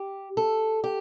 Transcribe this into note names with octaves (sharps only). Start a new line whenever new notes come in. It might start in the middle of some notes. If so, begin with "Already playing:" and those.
Already playing: G4
A4
G4